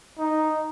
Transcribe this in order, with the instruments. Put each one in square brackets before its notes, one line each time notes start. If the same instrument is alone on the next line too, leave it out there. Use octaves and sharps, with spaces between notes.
[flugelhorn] D#4